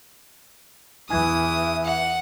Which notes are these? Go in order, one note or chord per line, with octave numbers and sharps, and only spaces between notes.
E2 E3 E5 G#5 D#6 G#6
F#5